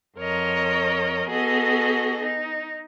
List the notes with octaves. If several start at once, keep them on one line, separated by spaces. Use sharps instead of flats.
F2 A#4 C#5 D#5
B3 F#4 G#4 A4 D#5
D#4